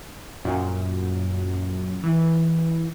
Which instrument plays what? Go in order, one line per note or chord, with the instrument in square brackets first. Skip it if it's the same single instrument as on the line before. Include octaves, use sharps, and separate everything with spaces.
[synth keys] F#2 A#2
E3